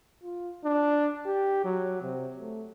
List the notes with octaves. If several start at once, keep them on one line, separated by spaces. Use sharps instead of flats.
F4
D4
G4
F#3
C3
A3